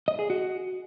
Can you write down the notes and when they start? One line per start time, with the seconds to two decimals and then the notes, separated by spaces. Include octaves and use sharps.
0.08 D#5
0.19 G#4
0.30 F#4